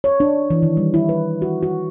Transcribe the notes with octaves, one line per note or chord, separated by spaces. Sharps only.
C#5
D4
E3
D#3
G3
E4
B4
F#4
F#4